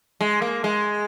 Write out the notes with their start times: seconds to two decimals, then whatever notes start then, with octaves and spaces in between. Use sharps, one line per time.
0.21 G#3
0.42 A#3
0.64 G#3